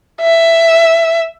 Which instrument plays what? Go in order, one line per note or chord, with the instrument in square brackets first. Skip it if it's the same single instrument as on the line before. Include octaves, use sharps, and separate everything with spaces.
[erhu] E5